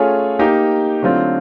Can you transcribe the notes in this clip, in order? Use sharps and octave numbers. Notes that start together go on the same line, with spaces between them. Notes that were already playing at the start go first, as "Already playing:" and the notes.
Already playing: A3 C#4 F4 G#4
A#3 D#4 G4
D3 F#3 A3 C4 F4